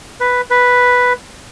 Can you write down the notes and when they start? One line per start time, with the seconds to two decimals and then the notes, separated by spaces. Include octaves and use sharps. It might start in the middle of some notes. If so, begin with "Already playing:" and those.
0.20 B4
0.51 B4